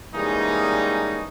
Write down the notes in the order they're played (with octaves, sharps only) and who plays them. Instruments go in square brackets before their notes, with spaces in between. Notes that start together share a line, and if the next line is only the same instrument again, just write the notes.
[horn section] E3 G3 G#3 A#3 C#4 D#4